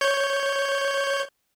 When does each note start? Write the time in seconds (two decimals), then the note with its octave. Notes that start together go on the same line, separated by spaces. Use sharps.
0.01 C#5 G6